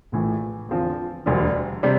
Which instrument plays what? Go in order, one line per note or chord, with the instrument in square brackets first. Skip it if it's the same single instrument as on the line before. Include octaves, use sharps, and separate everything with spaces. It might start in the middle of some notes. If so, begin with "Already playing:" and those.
[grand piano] A#1 A2 E3
E2 D3 F3 C4
E1 D2 D3 G3
C3 G3 D4